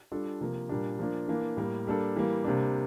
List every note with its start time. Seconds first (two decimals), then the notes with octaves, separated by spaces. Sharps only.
0.11 G3 D4 F4 A4
0.41 C3 F3 A#3
0.69 A#2 G3 A#3 D4
0.99 F3 A#3 D4
1.28 E3 A#3 D4
1.57 A2 G3 A#3
1.87 G3 A#3 D4 A4
2.16 E3 G3 A#3
2.44 C3 G3 A#3 D4